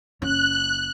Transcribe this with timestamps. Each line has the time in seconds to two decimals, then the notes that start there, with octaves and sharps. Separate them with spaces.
0.22 F#1 C#4 F#6